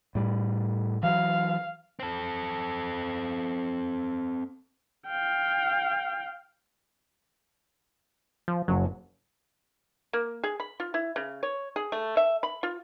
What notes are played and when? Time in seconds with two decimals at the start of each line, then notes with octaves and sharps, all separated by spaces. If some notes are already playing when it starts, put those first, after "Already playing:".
0.15 A2 G3
1.03 E3 F#3 F5
2.00 C4 A4
5.07 F5 G5
8.48 F3
8.68 F#1 F#3
10.13 A#3
10.43 G#4
10.60 B5
10.80 F4
10.94 E4
11.16 C#3
11.43 C#5
11.76 G#4
11.92 A3
12.17 E5
12.43 B5
12.63 F4